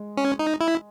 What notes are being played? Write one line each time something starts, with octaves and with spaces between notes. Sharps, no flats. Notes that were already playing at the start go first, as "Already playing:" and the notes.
Already playing: G#3
C#4
D#4
E4